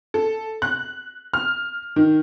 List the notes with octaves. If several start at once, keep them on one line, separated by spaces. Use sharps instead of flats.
A4
F#6
F6
D#3